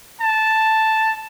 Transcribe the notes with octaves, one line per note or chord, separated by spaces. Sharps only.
A5